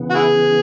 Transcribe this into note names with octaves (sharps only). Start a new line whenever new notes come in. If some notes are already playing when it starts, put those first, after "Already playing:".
Already playing: C#3 E3 B3
F#4
E4 G#4